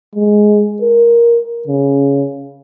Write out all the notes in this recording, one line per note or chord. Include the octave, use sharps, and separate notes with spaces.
G#3
A#4
C#3